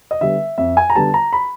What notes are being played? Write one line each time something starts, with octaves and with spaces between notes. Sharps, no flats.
D#5
D3 G3 B3 E5
F2 E5
G#5
A#5
D3 G3 B3 A5
A#5
B5